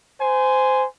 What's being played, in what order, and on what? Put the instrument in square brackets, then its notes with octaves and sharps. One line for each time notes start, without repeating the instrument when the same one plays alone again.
[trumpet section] C5 G#5